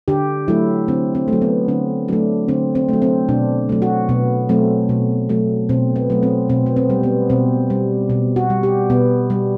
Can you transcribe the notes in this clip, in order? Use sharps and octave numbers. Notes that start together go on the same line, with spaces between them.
D3 G4
F#3 A3 E4
D3 C4
C4
F#3 A3
B3
D3 C4
F#3 A3 D4
D3 C4
C4
F#3 A3
C4
B2 D4
F#3 A3
F#4
B2 B3
F#3 A3 C4
B2
F#3 A3
B2 C4
B3
F#3 A3
C4
B2 C4
B3
C4
G3
B3
B2 C4
G3
B2
F#4
G3
G4
B2 B3
G3